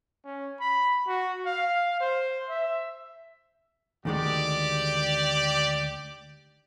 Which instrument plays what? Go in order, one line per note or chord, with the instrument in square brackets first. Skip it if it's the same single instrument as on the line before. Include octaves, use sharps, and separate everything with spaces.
[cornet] C#4
B5
F#4
F5
C5
E5
[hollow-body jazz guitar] D2 D#3 G#3 [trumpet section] G4 D5